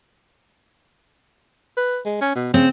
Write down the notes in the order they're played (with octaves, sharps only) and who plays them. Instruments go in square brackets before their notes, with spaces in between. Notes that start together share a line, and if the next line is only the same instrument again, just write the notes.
[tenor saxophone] B4
G#3
C#4
B2
[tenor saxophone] C#3 [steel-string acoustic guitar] C4